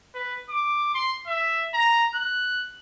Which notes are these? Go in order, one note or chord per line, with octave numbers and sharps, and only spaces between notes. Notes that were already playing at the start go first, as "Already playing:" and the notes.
B4
D6
C6
E5
A#5
F#6